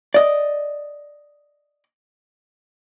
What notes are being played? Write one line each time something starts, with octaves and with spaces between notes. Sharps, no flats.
D5 D#5